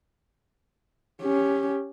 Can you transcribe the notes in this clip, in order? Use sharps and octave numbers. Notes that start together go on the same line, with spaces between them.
C#4 G4